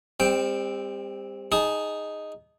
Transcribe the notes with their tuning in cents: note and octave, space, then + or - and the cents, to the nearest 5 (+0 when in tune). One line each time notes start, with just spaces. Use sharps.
G3 +35 C4 +0 G5 +0
D#4 +0 G#4 +0 A5 -30